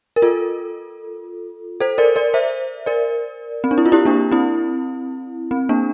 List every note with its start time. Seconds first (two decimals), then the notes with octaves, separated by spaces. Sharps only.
0.16 A#4
0.22 F4 A4
1.80 A4 C5
1.98 A#4 D5
2.16 A#4 D5
2.34 C5 E5
2.86 A#4 D5
3.64 C4
3.71 D4
3.78 E4
3.86 F4
3.92 E4 G4
4.05 A#3 D4
4.32 C4 E4
5.51 C4
5.69 A#3 D4